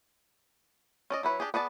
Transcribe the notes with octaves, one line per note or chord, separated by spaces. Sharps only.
C#4 D5 D#5
F#3 E4 B4 C#5
D4 G4 G#4
B3 G#4 D5 A5